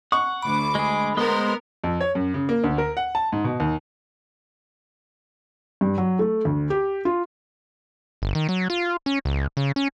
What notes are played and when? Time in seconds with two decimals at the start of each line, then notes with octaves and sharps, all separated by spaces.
0.12 F#5 C#6
0.42 D2 B5 D6
0.75 G#3 G#4
1.17 G#3 B3 A#4 C5
1.84 F2
2.01 C#5
2.15 F#2
2.34 C#3
2.49 A#3
2.64 D2
2.78 A#4
2.97 F#5
3.15 A5
3.33 G#2
3.44 B2
3.60 D#2
5.81 G2
5.98 F#3
6.19 A3
6.45 D2
6.70 G4
7.05 F4
8.22 G1
8.35 D#3
8.49 F#3
8.70 F4
9.06 C#4
9.25 C#2
9.57 C#3
9.76 C#4